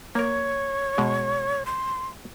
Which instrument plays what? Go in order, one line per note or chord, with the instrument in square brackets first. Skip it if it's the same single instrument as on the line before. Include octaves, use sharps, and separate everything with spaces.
[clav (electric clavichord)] A#3 A#4 [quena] C#5
[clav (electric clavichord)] B2 G#3
[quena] C6